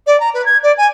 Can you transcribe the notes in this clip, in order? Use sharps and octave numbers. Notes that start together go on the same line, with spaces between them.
D5
A#5
B4
G#6
D5
G#5